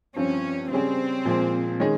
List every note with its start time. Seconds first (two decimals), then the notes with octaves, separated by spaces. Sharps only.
0.16 G2 F3 C4 C#4
0.71 C#3 G3 C4 C#4 G#4
1.25 A#2 F3 G#3
1.80 D#3 G#3 C#4 G#4